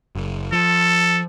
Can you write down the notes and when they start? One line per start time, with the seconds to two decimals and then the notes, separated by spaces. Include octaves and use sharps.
0.15 F#1
0.52 F3 A4